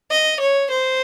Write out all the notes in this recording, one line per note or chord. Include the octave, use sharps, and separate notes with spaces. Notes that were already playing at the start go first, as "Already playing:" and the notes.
D#5
C#5
C5